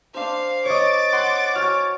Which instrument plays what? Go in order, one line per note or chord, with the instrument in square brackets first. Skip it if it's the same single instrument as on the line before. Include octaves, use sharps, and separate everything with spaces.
[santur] D4 C5 [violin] F5
[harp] C#5 D#5 [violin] D6 A6
[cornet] F#5 [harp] C6
[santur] F#4 G#5 [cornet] C#5 [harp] F6